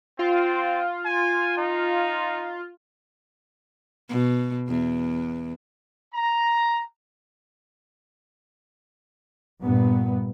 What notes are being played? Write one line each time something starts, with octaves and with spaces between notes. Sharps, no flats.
C4 F4
G#5
D#4
B2
E2
A#5
G2 A#2 B3